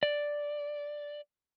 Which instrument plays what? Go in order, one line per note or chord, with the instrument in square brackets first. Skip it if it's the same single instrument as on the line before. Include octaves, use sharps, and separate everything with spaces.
[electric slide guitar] D5